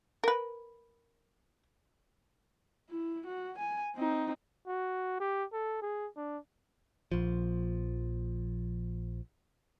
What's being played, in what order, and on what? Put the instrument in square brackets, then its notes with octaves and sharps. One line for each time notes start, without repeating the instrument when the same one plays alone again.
[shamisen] A#4 B4
[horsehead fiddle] E4
F#4
G#5
C4 D#4
[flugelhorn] F#4
G4
A4
G#4
D4
[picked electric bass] A#1 F3